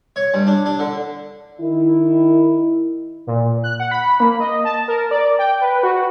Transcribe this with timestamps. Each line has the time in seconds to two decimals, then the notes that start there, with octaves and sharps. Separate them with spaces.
0.16 C#5
0.34 G2
0.47 D4
0.66 D4
0.79 D3
1.61 D#3 E4
3.27 A#2
3.64 F#6
3.80 F#5
3.91 B5
4.20 A#3
4.40 D#5
4.65 A5
4.88 A#4
5.11 D5
5.39 G5
5.61 B4
5.83 F#4